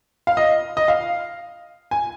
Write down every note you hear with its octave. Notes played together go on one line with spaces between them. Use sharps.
F5
D#5
D#5
F5
G#5